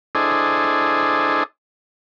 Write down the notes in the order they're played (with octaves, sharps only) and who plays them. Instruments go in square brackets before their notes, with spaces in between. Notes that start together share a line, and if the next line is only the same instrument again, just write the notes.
[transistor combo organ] D4 E4 G#4 A4 C5 D#5